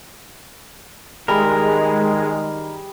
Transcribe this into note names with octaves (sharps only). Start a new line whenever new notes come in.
D#3 G3 G#3 G#4 A#4 B5